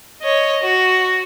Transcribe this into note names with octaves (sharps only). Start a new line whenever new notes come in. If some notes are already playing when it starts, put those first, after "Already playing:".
C#5 D#5
F#4